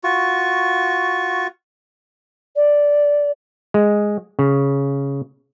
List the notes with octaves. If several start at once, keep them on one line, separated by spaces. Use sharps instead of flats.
F4 F#4 C#6
D5
G#3
C#3